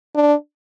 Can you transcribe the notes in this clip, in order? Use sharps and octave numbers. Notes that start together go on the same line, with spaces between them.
D4